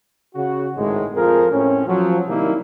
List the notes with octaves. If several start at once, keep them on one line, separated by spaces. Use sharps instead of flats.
C#3 F#4
G#1 A2 G#3
F2 F3 G#4 A#4
A2 C4 C#4
F3 F#3
C3 D#3 G3 A#3 E4